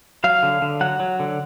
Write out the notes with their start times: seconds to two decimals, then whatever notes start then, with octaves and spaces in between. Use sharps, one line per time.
0.24 F#3 F5
0.43 D3
0.62 D3
0.81 F#3 F#5
1.00 F#3
1.20 D3